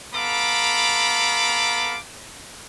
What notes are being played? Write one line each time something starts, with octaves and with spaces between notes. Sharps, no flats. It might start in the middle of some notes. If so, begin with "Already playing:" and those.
B3 A4 F5 A#5 B5 D6